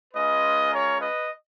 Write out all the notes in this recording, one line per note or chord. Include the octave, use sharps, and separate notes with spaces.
G#3 C#4 F4 B4 D#5
A#4 C#5
B4 D#5